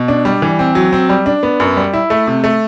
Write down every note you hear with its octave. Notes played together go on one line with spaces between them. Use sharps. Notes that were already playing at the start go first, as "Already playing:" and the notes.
Already playing: B2
D4
G3
E3
C4
F#3
C4
G3
D4
B3
F#2
G3
E4
A3
C3
A3